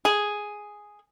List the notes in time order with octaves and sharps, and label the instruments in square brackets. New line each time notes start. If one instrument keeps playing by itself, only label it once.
[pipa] G#4